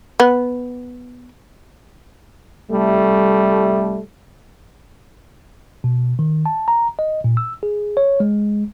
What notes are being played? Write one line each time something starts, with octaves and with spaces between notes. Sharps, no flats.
B3
C2 G3 A3
B2
D#3
A5
A#5
D#5
A#2
E6
G#4
C#5
G#3